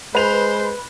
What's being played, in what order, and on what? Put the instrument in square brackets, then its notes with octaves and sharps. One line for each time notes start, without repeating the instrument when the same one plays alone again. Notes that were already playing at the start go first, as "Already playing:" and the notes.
[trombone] G#3 [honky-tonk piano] B4 F7 [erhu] C5